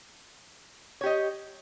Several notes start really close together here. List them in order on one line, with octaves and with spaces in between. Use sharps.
C#5 G4 D#5